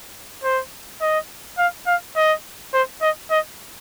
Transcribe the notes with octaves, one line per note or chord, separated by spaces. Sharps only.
C5
D#5
F5
F5
D#5
C5
D#5
D#5